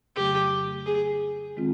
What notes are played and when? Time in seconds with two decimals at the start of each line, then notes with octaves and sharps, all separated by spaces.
0.16 F2 C#3 F#3 A3 G4
0.86 G#4
1.57 D#3 G#3 C4 F4